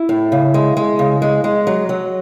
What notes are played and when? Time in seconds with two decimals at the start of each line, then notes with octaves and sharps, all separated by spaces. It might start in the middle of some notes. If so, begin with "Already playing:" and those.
Already playing: E4
0.09 A2
0.32 C#3
0.54 G#3
0.77 G#3
0.99 C#3
1.22 G#3
1.44 G#3
1.67 F#3
1.89 F#3